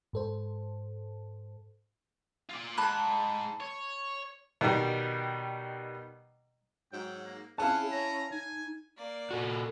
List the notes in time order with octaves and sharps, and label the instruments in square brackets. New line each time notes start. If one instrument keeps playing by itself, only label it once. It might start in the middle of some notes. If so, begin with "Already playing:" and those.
[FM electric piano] G#2 A4 C5
[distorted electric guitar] F4 D5
[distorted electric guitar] G#2 [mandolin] A5 B5 F#6
[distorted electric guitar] C#5
[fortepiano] B2 D#3 G3
[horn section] G#2 F#3 [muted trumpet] G5
[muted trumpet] A#3
[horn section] C#4 E4 [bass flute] G#4 [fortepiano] F5 A5 [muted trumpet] F#5
[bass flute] C#5 [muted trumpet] A#5
[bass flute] D#4 [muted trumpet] G#5
[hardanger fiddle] A#3 D5
[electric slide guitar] A#2 F#4 [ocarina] A4